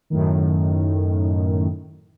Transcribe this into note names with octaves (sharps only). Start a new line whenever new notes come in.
F#2 A2 D#3